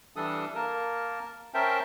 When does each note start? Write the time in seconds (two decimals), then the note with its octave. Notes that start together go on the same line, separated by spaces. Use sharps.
0.16 E3 G3 D4 A4 D#6
0.55 A#3 A#4 A5
1.54 C#4 A#4 C5 E5 G5 A5